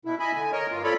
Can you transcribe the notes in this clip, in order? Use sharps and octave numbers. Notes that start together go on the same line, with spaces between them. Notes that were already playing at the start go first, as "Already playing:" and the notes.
B2 E4
D#5 E5 G#5 B5
D3 G#5
A#4 C#5 D#5
G2 A#3 F4
C4 F4 A4 C#5 D5 B5